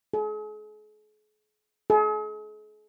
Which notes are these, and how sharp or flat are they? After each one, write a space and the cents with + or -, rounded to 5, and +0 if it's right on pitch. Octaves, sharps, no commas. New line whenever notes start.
G#4 +45
G#4 +45